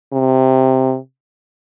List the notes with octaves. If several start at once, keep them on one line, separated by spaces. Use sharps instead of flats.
C3